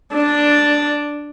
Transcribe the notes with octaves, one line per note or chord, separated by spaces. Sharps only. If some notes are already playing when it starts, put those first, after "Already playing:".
D4